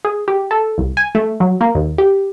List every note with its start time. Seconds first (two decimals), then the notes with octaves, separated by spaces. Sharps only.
0.05 G#4
0.28 G4
0.51 A4
0.78 C2
0.97 G#5
1.15 A3
1.40 F#3
1.61 A#3
1.75 D#2
1.98 G4